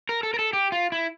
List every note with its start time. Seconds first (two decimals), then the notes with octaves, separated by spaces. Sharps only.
0.09 A#4
0.23 A4
0.34 A#4
0.39 A4
0.53 G4
0.72 F4
0.92 E4